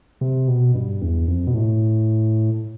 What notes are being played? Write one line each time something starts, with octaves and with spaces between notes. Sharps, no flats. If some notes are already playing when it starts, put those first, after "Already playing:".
C3
B2
G2
E2
F2
B2
A2